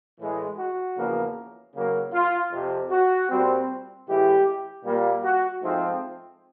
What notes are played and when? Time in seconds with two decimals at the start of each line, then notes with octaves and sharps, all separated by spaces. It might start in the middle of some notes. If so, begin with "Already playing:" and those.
0.18 A2 E3 G#3
0.57 F#4
0.95 E2 C#3 F3 A#3
1.74 C#3 F#3 A#3
2.13 F4
2.51 F2 C3 F3
2.90 F#4
3.30 A#2 G3 C4
4.07 A2 E3 G#3 G4
4.84 A#2 G3 A#3
5.23 F#4
5.62 G#2 F3 A3 C4